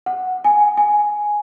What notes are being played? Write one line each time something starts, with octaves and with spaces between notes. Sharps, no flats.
F#5
G#5
G#5